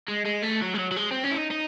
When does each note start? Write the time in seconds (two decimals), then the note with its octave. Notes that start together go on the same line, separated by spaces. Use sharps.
0.08 G#3
0.26 G#3
0.43 A3
0.62 F#3
0.74 G#3
0.79 F#3
0.91 F#3
0.97 G#3
1.11 C4
1.24 C#4
1.32 E4
1.38 D#4
1.51 D#4